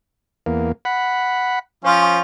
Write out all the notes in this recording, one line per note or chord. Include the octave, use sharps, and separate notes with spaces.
E2 A#3
F#5 B5
F3 C#4 F4 C5